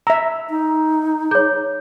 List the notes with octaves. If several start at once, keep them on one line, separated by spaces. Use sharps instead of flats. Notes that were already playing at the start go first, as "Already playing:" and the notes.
E5 A#5 E6
D#4
G#4 C#5 G6